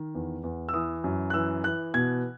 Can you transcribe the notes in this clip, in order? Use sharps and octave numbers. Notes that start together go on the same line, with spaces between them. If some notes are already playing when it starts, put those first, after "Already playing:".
Already playing: D#3
E2
E2
E6
E3 D#6
F#2
F#6
E3 E6
E3 F#6
B2 G#6